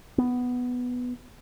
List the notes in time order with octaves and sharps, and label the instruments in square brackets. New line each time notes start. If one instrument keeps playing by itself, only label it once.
[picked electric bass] B3